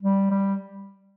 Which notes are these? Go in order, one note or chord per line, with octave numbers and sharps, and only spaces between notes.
G3
G3